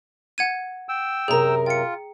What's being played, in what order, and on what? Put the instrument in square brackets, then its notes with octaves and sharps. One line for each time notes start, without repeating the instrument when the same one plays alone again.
[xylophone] F#5 G#6 D#7
[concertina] G5 E6
[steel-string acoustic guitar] F#2 C3 A#4 [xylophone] G#4 A#5
[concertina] F4 [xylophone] G5 C#7